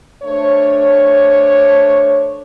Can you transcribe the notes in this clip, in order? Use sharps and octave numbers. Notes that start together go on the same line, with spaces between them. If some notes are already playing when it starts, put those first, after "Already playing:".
A3 D4 C5 C#5